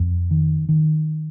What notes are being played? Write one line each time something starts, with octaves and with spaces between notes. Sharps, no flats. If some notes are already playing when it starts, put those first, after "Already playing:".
Already playing: F2
D#3
D#3